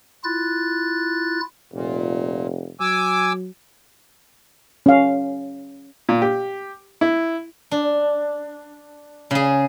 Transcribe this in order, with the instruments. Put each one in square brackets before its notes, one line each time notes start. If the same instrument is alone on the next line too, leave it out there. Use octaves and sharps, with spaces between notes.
[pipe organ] E4 F4 F#6 A6
[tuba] F1 [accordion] A#2
[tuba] F#3 [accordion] G#5 D6 E6
[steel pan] C#4 F5
[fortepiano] A#2
G4
E4
[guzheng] D4
C#3 G#4